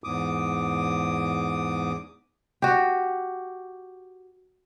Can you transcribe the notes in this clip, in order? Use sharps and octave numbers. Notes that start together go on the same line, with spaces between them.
E2 G#2 D6 D#6
F#4 G4